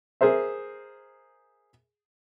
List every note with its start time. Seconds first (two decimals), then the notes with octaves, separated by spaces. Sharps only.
0.21 G#4 A#4 C5 E5